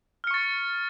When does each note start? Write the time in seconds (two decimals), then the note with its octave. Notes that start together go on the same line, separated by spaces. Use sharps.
0.24 F6
0.27 C#7
0.31 C#6
0.34 A6